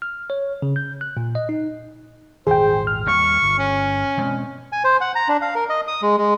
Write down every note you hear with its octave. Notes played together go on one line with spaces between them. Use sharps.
F6
C#5
C#3
G6
F#6
A#2
D#5
D#4
D#1 G#1 G#4 C5 G5
F6
D#2 G3 A#3 C#6
G1
C#4
B2 G#3 C4
G#5
C5
F#5
A#5
D4
F5
A#4
D#5
D#6
G#3
G#3